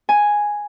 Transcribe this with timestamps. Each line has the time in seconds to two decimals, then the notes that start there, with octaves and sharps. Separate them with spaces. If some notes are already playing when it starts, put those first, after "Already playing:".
0.09 G#5